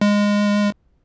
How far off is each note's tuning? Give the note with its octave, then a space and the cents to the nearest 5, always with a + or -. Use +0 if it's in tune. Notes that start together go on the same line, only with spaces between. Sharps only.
G#3 -15